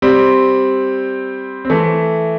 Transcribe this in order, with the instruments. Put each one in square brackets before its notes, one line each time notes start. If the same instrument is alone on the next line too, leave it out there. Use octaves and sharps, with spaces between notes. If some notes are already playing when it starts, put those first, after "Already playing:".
[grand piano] G3 C4
C4
E3 A3